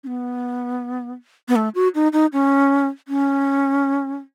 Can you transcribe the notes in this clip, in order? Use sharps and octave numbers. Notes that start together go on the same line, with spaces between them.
C#4
B3
B3
A3
F#4
D#4
D#4
C#4
C#4